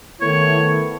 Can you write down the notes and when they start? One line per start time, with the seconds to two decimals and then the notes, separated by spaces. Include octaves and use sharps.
0.21 D#3 A3 B3 E4 C#5